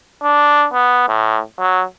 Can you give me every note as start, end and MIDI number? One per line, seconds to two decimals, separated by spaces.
0.23 0.66 62
0.74 1.06 59
1.08 1.40 45
1.59 1.84 54